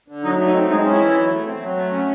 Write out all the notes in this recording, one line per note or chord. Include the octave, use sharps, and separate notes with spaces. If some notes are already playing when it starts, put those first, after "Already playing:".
D3
F#3 D#4
A3
D#4
C4
G#3 D#4
C#4
E4
E3
F#3
A3
C4
F#3
A3
C#4